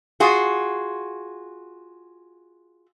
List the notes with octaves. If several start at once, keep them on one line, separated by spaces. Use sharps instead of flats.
F4 F#4 G#4